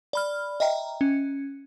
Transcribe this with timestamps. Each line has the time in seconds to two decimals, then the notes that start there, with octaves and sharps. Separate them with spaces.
0.13 D5 B5 F6
0.60 D#5 E5 G5 A#5
1.01 C#4